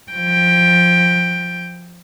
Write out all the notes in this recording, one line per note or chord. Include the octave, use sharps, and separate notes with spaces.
F3 G5